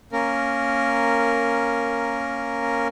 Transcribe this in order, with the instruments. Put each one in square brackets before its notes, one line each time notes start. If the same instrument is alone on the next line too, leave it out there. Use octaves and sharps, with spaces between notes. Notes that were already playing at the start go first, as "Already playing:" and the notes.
[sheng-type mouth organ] A#3 C#4 A#4